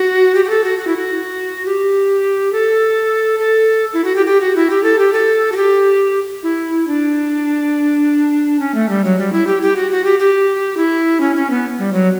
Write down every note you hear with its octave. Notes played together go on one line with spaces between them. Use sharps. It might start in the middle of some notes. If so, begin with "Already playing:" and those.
Already playing: F#4
G4
G4
A4
F#4
F#4
E4
F#4
G4
A4
A4
E4
F#4
G4
G4
F#4
E4
G4
A4
G4
A4
F#4
G4
E4
D4
C#4
A3
G3
F#3
G3
E4
G4
G4
F#4
F#4
G4
G4
E4
C#4
C#4
B3
G3
F#3